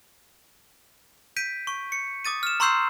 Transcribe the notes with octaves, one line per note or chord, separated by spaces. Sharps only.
G6 B6 D7 D#7
C#6
C#7
D6 D#6 A6 D#7
F6 E7
A#5 C6 C#6 E6 G6 C7